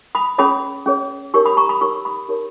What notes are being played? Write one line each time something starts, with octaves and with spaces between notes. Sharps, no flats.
B5 D#6
C#4 G#4 C#5 B5 D#6
C#4 G#4 C#5
D#4 G4 A#4 C#5 C#6 E6
B5 D#6
A#5 C#6
B5 D#6
D#4 G4 A#4 C#5 C#6 E6
B5 D#6
D#4 G4 A#4 C#5